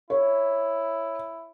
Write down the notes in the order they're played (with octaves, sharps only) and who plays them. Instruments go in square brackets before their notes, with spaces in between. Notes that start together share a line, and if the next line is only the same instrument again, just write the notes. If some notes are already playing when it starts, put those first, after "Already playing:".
[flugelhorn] E4 [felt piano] C#5